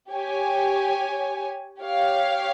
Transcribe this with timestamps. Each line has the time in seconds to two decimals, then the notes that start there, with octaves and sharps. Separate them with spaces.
0.11 G4 C#5 G#5
1.80 G4 C#5 F5